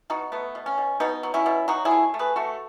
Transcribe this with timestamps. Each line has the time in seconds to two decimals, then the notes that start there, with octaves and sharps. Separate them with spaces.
0.10 B2 D#4 F#4
0.32 A3 B3
0.55 B2
0.66 C#4
0.78 B2
1.00 B2 B3 D#4
1.23 F#3
1.34 C#4 E4
1.46 B2
1.68 F#3 D#4 F#4
1.85 E4 G#4
1.91 A3
2.14 A3
2.19 G#4 B4
2.36 A3 F#4 A4